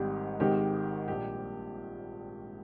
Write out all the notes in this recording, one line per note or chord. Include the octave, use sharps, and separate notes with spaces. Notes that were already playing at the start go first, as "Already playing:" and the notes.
Already playing: G#1 G#2 D#3 G3 G4
G#1 G#2 D#3 G#3 G4
A#1 A#2 G3 G4